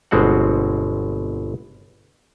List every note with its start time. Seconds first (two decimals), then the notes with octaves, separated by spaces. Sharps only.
0.11 G1 B2 G#3 C4 F#4 F#5